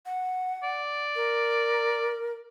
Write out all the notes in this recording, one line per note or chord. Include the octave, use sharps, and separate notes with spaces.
F#5
D5
A#4